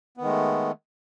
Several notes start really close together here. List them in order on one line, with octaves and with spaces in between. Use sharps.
B3 D#3 G#3 A3